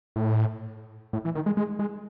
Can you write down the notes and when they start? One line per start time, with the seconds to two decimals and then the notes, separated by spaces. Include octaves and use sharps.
0.16 A2
1.13 A2
1.25 E3
1.35 D#3
1.46 G#3
1.57 G#3
1.79 G#3